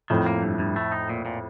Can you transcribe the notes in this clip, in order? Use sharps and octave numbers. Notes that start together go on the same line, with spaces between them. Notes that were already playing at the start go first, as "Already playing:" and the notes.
F2 A2 D#3
A#3
G2
G2
A3
D#4
A#2
A#2